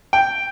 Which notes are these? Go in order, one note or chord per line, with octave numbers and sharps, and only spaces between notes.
G5